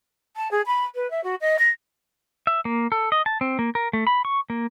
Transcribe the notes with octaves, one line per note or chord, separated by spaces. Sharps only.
A5
G#4
B5
B4
E5
F#4
D#5
A#6
E5
A#3
A4
D#5
A5
C4
A#3
A#4
A3
B5
C#6
A#3